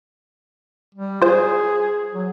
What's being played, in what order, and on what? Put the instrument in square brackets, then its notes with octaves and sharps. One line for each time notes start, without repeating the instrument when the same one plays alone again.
[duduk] G3
[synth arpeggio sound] F4 C5 [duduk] G#4
[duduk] F#3